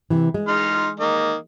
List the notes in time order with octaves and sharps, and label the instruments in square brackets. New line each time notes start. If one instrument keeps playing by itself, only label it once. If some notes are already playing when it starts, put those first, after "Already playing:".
[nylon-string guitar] C3 E3
G#3
[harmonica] D#4 C6 F6
D#3 A#3 D#5